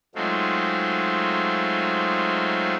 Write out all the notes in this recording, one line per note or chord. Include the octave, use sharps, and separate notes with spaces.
F#3 G#3 A3 C4 D#4 F4